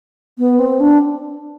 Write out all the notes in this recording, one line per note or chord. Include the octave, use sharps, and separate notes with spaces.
B3
C4
D4